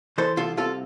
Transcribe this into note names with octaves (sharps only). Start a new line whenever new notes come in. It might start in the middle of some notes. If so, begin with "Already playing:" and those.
E3 A4 C5
C2 F4 A4
C3 F4 A4